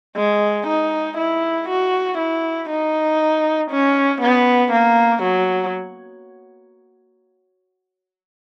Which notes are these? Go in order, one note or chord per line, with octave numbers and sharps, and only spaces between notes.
G#3
D#4
E4
F#4
E4
D#4
C#4
B3
A#3
F#3